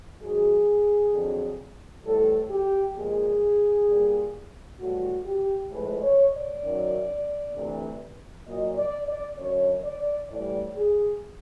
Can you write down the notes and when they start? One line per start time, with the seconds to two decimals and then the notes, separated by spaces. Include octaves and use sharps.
0.21 G#2 D#3 F#3 G#4
1.12 F2 D3 F#3
2.04 A2 E3 G3 A4
2.50 G4
2.96 A#2 F3 G#3 G#4
3.88 A#2 G3
4.79 A2 E3 G3 F#4
5.25 G4
5.71 A2 F3 G#3 B4
6.02 C#5
6.33 D5
6.63 F#2 D#3 F#3
7.55 D2 C3 E3
8.46 A#2 F#3 D#5
8.77 D5
9.07 D5
9.38 F#2 D3 F#3 C#5
9.83 D5
10.29 A2 E3 G3 D5
10.76 G#4